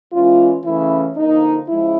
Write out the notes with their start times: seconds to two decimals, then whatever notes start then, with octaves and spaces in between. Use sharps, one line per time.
0.12 E3 G#3 C#4 F4
0.64 C#3 E3 A3 C#4 E4
1.16 D3 F3 A#3 D#4
1.69 C#3 F3 G#3 E4